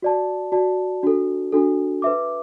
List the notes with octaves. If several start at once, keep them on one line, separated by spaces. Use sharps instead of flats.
F#4 D5 A5
F#4 D5 A5
D4 F#4 A4
D4 F#4 A4
B4 E5 D6